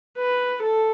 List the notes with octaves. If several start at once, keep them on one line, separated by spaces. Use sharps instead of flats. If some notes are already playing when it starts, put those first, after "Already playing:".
B4
A4